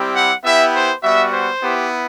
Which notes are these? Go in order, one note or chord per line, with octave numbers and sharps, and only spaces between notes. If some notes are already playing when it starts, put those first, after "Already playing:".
Already playing: G3 C4 E4 G4
F#5
B3 E4 G4 E5
C5
G3 B3 F#4 E5
C5
B3 E4 G4